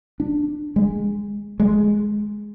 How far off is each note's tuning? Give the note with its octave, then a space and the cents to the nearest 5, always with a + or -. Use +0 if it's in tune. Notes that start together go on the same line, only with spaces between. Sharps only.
D4 +15
G#3 -15
G#3 +5